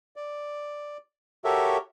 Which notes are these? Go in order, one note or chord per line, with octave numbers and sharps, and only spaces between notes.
D5
F#4 G4 A4 A#4 C#5 E5